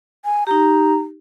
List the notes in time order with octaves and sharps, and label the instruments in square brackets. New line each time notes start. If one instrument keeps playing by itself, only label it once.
[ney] G#5
[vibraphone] D#4 G4 [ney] A#5